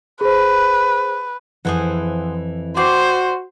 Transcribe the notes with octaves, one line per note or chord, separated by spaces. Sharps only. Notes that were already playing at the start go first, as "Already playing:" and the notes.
G#4 B4 C5
F2 E3 E4 G#4 C5 F#5
F#4 C5 D5 G5 C6